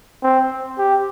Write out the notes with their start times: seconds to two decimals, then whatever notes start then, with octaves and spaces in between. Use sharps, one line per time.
0.23 C4
0.78 G4